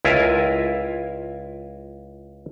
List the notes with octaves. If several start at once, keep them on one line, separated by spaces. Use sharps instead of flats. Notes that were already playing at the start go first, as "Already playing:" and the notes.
C#2 E4 F4 A#4 G#5